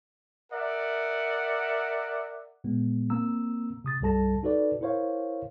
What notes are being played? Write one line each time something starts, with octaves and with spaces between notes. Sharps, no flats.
A#4 D5 E5 F#5
A#2 G#3 B3
A#3 C4 A#5 E6
C3 D#6 A6
C2 G2 G3 A4 A5 A#6
D#4 F#4 A4 B4 D5
E4 A#4 C5 C#5 F5